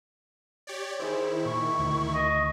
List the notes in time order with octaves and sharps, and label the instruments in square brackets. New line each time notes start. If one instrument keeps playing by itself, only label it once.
[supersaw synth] G4 C#5 D5
[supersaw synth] D#3 E4 [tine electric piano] G#4 C5
[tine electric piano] A#2 [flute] C#6
[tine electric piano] D2
[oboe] D#5